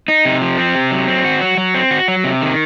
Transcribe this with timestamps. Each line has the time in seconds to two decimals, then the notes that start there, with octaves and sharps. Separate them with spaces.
0.08 D#4
0.25 C3
0.41 F3
0.58 C4
0.75 C3
0.91 F#3
1.08 C4
1.24 F#4
1.41 F#3
1.57 F#3
1.74 C4
1.91 F#4
2.08 F#3
2.24 C3
2.41 D#3